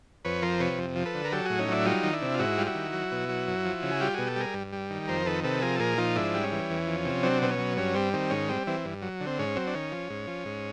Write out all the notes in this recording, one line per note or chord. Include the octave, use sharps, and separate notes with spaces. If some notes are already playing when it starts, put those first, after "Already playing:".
F2 B4 C#5
F3 A#4 C5
C3 B4 C#5
F2
F3
A4 B4
D3
A#4
F#3 G4 A4
A2 F#4 G#4
C#4 D#4
F#3 D4 E4
G3 D#4 F4
D#3
D4 E4
C3
F4
G#2 E4 F#4
G3 F4
E4 F#4
D#3
F#3
B2
F#3
F#2
F3
C#3
G#4
G3 F4 G4
B2 F#4 G#4
G4 A4
G3 G#4 A#4
G2
G3
D#3
F2 A#4 C5
D#3 A4 B4
C3 A4 B4
F3 G#4 A#4
A4
A#2 G#4 A#4
F3 D#4 F4
G#2 D4 E4
G3
C#4
E3
E2
F3
C3
F#3 C4 D4
B2 C4
C#4
F#3
G2 C#4
G3 C4
D#3 C4
G#2 C#4
G3 C4
E3 C4
G2
F#3
D3
C4
G#2 C#4
F#3 C4
D4
D#3 C#4
F3
G#2
F3
G#2